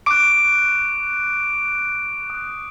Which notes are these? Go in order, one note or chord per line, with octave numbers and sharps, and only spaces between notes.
C#6 D6 F#6 D7
D#6 F#6